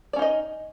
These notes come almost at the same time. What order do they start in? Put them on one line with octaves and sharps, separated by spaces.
D5 C#4 D#4 D#5